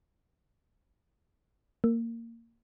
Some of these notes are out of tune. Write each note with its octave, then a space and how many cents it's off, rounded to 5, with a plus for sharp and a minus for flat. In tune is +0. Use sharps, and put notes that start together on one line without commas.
A#3 -20